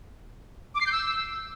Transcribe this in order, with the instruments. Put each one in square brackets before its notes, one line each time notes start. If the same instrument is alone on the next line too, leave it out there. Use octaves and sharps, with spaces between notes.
[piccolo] D6
C7
G6
E6